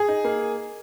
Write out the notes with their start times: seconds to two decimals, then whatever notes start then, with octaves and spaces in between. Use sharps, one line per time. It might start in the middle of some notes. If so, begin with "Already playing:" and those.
Already playing: G#4
0.08 D#4
0.25 A#3